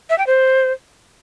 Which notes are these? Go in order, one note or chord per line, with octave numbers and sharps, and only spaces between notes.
E5
G5
C5